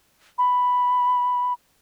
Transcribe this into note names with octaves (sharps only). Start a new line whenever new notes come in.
B5